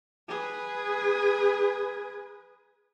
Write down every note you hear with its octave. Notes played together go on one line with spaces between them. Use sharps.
G#4 B4